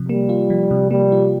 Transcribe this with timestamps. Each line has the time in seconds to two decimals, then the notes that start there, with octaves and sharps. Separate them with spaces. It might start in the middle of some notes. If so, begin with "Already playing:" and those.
Already playing: C3 F3
0.09 G3 A#3
0.29 F4
0.50 F3
0.71 C3
0.91 G3 A#3
1.12 F4